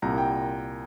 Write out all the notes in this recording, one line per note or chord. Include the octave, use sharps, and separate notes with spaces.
C2 A#2 A#5
G5